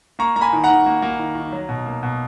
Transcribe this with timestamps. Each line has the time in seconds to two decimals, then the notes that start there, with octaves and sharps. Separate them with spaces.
0.19 A#3 A#5 C#6
0.36 A#3 A#5
0.41 G#5 B5
0.53 D#3
0.64 F#5 A#5
0.70 D#3
0.86 A#3
1.02 A#3
1.19 D#3
1.35 D#3
1.52 F#3
1.69 B2
1.86 A#3
2.03 B2